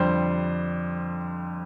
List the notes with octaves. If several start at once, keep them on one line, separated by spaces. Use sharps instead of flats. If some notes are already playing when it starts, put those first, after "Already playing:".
Already playing: F2 D3 G3 C5